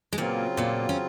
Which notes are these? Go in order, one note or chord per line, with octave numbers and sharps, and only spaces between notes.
G#3
A#2 C#3 F#3 A#3 C4 F4
A#2 A#3
C#4